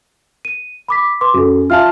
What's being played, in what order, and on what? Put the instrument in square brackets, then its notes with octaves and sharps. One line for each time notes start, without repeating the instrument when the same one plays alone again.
[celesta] D#7
B5 D6 B6
B4 C6 D6
[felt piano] F#2 [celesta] F#4 A4
[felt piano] F4 F5 A5 [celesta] E5 F6